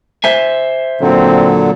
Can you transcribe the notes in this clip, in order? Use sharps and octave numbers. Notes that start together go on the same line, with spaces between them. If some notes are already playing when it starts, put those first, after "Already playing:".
C5 E5 G#5
A#2 D3 F#3 C4